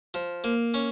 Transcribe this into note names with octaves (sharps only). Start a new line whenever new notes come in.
F3
A#3
C#4